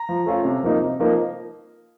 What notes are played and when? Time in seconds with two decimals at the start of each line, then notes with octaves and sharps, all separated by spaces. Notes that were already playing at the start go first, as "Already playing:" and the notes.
Already playing: A#5
0.09 F3
0.26 A3 C#4 F4
0.45 C3
0.63 F3 A#3 D#4
0.81 C3
1.00 F3 A#3 D#4